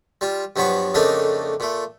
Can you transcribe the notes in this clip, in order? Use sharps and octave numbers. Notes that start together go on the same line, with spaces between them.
G3 F4
G2 F3 F#3 B3 B5 C#6
F2 C#3 A3 A#3 D4 D#4
A#2 A3